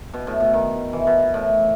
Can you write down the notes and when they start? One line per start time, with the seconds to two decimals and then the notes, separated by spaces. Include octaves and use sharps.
0.14 B2
0.27 A2
0.40 B2
0.54 D#3
0.93 E3
1.07 B2
1.34 A2